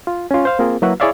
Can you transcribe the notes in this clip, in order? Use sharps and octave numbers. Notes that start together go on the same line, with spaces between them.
F4
C#4 F4
C5 F5
A#3 C4 F4 G#4 A#4
F#3 A#3 E4 F#4 B4
E4 G#4 C#5 D5 E5 F5